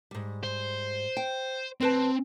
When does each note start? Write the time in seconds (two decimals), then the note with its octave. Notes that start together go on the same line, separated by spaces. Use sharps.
0.11 G#2 G3
0.44 C5
1.17 G5
1.81 D2 C4 B4 A5